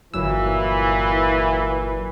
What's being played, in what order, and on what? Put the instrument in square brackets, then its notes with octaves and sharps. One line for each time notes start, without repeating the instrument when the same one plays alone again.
[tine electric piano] G1 F#3 E6 [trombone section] A#2 E3